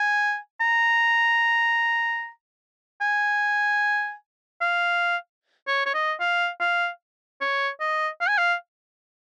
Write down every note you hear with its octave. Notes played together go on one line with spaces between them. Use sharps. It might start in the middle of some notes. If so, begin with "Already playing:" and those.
Already playing: G#5
A#5
G#5
F5
C#5
C#5
D#5
F5
F5
C#5
D#5
F5
G#5
F5